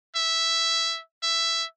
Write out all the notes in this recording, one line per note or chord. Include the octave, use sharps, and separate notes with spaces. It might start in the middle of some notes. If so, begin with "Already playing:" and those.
E5
E5